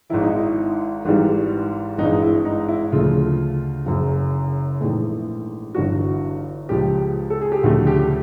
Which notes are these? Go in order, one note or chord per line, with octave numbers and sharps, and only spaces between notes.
G#1 G#2 D#3 E4
D#4
E4
G#1 G#2 E3 G3
G#1 G2 E3 G#3 D#4
E4
D#4
E4
D2 C#3 F3 A3 F4
F#1 F#2 C#3
A#1 G#2 E3 A3
G1 G2 E3 F#4
C#2 C#3 F3 G#3 G4
A4
G#4
G4
D2 C#3 F3 A3 F#4
G4
G4